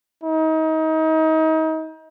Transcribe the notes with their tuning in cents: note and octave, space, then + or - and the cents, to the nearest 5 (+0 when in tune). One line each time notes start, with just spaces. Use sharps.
D#4 +30